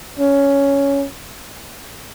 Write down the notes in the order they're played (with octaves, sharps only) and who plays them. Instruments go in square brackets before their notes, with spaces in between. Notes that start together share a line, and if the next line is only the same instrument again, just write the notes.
[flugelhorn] C#4